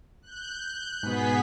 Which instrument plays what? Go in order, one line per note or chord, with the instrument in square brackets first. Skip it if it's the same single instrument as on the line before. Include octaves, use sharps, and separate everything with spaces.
[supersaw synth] F#6 G6
[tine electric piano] G#2 B2 [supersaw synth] B3 G#4 B6